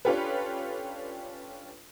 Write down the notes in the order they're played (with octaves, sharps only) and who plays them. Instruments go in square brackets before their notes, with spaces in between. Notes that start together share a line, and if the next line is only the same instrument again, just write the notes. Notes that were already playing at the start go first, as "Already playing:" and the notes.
[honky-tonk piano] C#4 D4 F4 G4 A4 B4